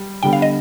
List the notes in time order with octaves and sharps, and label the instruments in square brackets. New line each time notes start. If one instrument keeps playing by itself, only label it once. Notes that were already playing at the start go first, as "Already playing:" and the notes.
Already playing: [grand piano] G3
[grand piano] D3 G3 B3 [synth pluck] G5
[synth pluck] F5
D#5